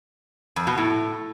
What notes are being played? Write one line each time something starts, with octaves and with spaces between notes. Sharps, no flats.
F2
B2
A2